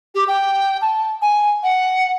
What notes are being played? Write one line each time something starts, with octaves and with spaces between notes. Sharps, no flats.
G4
G5
A5
G#5
F#5